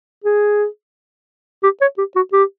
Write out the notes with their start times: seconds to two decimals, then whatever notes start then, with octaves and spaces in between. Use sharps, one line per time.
0.24 G#4
1.64 G4
1.81 C#5
1.98 G4
2.16 F#4
2.33 G4